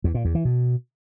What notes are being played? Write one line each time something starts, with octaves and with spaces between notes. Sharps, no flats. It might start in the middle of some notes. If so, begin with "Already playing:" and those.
E2
A#2
E2
E3
B2